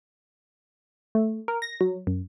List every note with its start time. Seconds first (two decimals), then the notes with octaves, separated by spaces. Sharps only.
1.15 A3
1.48 A#4
1.62 A#6
1.81 F#3
2.07 F#2